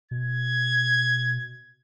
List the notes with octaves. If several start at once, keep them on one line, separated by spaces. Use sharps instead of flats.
B2 G#6